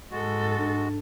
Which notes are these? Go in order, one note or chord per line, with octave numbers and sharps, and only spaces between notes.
G#2 G#3 F#4 A4
D4